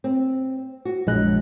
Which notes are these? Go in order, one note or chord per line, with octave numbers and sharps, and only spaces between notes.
C4
F#4
A#1 F#2 G#3 E4 D#5 F#6